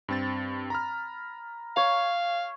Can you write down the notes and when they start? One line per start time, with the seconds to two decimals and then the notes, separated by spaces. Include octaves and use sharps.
0.08 G2 C4 A6
0.70 A#5 B5 F6
1.77 C#5 F5